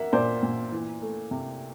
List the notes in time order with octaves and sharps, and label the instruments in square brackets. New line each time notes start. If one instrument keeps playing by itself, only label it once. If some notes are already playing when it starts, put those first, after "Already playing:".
Already playing: [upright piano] A#3 E5 F#5
A#2 C5 D5
A#2
E3
A3
C3